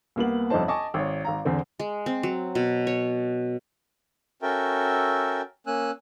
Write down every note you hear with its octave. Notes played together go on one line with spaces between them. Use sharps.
C2 A#3 B3 F#7
G1 F2 D4 D#4 C5 A5
D#5 G#5 A5 C#6 D6
G#1 C#5
G#1 F5 A#5
E2 D3 C4 C5
G#3
C4
F#3
B2
C#5
C#4 F#4 A4 A#4 E5 G5
A#3 C#4 G#5 E6 F#6